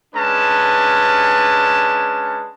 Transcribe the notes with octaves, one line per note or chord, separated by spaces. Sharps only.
G#3 C#4 D4 B4 A5